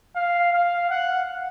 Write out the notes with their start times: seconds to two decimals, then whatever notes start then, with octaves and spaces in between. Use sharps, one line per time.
0.15 F5
0.52 F5
0.90 F#5